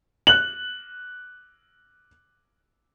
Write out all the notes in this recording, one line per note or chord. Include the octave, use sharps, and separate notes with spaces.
F#6 F#7